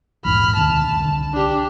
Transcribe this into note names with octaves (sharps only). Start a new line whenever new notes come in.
A#1 E2 G#2 B5 F6
E1 D2 D#3 A5
C2 D3
D4 G4